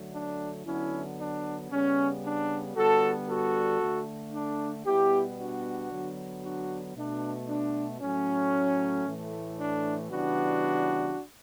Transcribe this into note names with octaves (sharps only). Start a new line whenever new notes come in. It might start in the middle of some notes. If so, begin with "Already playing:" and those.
Already playing: D3 F#3 A3
D4
D3 F#3 B3 C#4 E4
D4
C#3 G3 B3 C#4
D4
D3 G3 B3 F#4 A4
F#4 A4
D3 A3
D4
B2 G3 B3 E4 G4
D4 F#4
D3 F#3 B3
D4 F#4
B2 A3 D4
D4
A2 F#3 A3 C#4
A2 E3 A3
D4
C#3 E3 G3 B3 D4 F#4